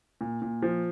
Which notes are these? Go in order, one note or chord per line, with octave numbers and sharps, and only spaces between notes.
A#2
A#2
F3